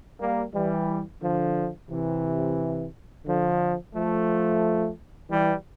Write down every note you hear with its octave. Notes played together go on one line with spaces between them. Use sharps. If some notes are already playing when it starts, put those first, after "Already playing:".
G3 A#3
E3 G3
D3 F3
C3 E3
D3 F3
F3 A3
E3 G3